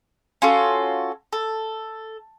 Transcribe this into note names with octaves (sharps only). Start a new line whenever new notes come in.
C#4 F4 F#4 A4
A4